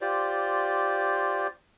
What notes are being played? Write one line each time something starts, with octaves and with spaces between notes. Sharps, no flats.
F4 G4 C5 D5